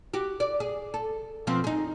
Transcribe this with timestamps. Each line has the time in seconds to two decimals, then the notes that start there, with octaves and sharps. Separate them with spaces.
0.14 F#4 G4
0.40 D5
0.60 G#4
0.94 A4
1.47 B2 F3 C4
1.64 D#4 G#4